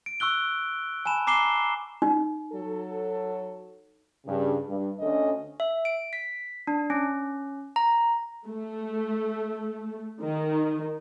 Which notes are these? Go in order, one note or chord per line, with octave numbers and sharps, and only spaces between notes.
D7
C#6 E6 F#6 G7
G#5 A5 B5 E7
A#5 D6 C7 E7 G7
D#4
F#3 A4
G2 C#3
G2
D2 D3 C#4 A4 D#5
E5
D7
B6
D4
C#4
A#5
A3
D#3